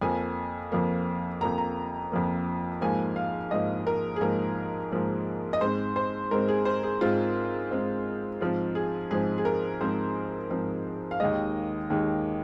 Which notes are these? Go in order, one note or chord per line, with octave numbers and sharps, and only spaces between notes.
F2 F3 A#3 G#5
F2 F3 A#3
F2 F3 A#3 A#5
A#5
F2 F3 A#3
G#2 F3 A#3 G#5
F5
G#2 F3 A#3 D#5
A#4
G#4
G#2 F3 A#3 A#4
G#2 F3 A#3
D#5
G#2 G#3 C4 C5
C5
G#2 G#3 C4 A#4
G#4
C5
G#4
G#2 G#3 C4 F4
G#2 G#3 C4
G#2 F3 C4 F4
G#4
G#2 F3 C4 G#4
G#4
A#4
G#2 F3 C4 C5
G#2 F3 C4
F5
D#2 D#3 G#3 D#5
D#2 D#3 G#3